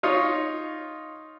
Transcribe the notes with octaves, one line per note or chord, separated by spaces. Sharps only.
D#4 F4 C#5 D#5